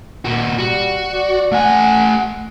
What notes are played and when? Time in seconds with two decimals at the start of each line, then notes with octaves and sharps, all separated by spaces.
0.25 A#2 F#4
0.59 G3 F#4
1.12 D5
1.52 A3 F#5 G#5